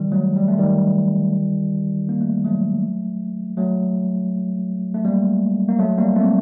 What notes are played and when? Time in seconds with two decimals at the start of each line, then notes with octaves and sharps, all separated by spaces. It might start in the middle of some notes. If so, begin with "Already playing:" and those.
Already playing: D#3 G3
0.12 F#3 A3
0.36 G3
0.48 A3
0.59 D#3 G3
2.09 A#3
2.21 A3
2.33 G3
2.45 F#3 A3
3.57 F#3 A3
4.94 A3
5.05 G3 A#3
5.69 A#3
5.79 F#3 A3
5.98 G3 A#3
6.16 A3 C4